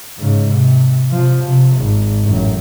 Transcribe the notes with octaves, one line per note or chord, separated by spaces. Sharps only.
G#2 C#3
C3
C3 F3
C3
G#1
A1 F#2